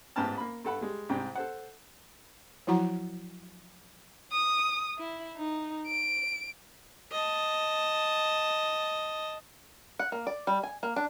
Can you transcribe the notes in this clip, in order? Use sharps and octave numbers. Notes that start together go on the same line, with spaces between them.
A1 G#2 B3 G5 A5 F6
A#3 B5
G2 A4 F#5 B5
G3 G#3
C2 G#2 C3 G5
A4 C5 F#5
F3 F#3 E4 F#4 F#5 A#5
D#6
E4
D#4
D7
D#5 A5
F#5
A#3
D5
G3
G#5
A#3
D4